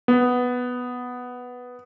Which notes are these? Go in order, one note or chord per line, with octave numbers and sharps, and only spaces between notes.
B3